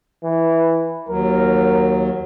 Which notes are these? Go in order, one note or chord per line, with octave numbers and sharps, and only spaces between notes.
E3
D#2 F#3 A#4